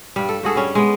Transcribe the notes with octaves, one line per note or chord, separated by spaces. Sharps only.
G2 G3
A4
G2 F#4 G#4 A4
G3 C#4
G#3 B3